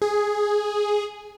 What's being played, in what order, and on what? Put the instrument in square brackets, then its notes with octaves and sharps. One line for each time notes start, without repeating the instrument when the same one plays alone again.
[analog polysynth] G#4